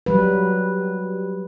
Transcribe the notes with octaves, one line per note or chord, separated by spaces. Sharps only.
F#3 G3 B4